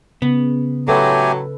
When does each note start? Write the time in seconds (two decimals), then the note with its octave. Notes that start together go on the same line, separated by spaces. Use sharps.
0.22 C#3 B3
0.88 A2 F#3 A3 G4 A4 B4 G#5